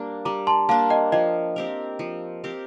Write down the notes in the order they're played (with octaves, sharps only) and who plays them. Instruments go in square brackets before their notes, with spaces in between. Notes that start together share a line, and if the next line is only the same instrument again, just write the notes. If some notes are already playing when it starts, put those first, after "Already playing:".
Already playing: [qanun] G3 A#3 D4
[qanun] G3 [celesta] A#5 D6
[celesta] A5 C6
[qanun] A#3 D4 [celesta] F5 A5
[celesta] D#5 G5
[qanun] F3 [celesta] D#5 G5
[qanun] C4 G4 A#4
F3
C4 G4 A#4